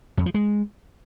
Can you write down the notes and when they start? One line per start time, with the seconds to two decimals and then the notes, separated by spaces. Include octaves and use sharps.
0.17 F2
0.26 F3
0.34 G#3